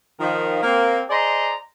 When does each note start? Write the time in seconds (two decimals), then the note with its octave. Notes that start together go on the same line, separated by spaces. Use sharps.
0.20 D#3 F3 F5
0.63 A#3 C4
1.09 G#4 C5 D5 D#5 A#5 C6